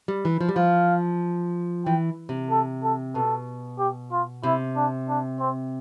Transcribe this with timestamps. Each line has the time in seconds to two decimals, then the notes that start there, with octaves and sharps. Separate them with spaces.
0.08 G3
0.25 E3
0.41 F3
0.49 G3
0.56 F3 F5
1.86 E3 G5
2.29 C3
2.50 A4
2.83 A4
3.15 B2 A4
3.79 G4
4.12 F4
4.43 C3 E4
4.76 D4
5.09 D4
5.40 C4